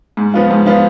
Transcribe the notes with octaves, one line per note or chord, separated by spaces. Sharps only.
G#2
F3 B3 F4
G#2
F3 B3 F4